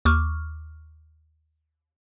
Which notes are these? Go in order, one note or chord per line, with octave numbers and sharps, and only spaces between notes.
D#2 C#6 D6 F6